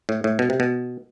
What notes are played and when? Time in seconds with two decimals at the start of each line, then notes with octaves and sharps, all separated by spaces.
0.09 A2
0.24 A2
0.39 B2
0.50 C3
0.60 B2